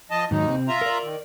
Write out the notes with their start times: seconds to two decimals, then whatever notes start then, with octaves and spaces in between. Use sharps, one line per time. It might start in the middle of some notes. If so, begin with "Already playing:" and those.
0.11 F3 D#5 A5
0.31 D#2 G#2 D#3 F#3 D#4
0.48 C3 C4
0.68 F4 E5 A#5
0.81 A#4 D5
1.04 D#3